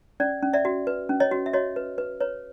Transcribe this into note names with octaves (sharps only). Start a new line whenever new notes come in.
C#4 D5
C#4
D5 E5
F#4
B4
C#4
C#5 D#5
F#4
E5
F#4 C#5 D#5
B4
B4
B4 C#5